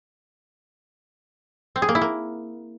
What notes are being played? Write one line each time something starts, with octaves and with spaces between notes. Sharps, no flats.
C4
G#4
A#3
E4
A#3